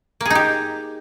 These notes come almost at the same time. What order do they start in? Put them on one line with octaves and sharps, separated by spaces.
A#3 G#4 D#4 G4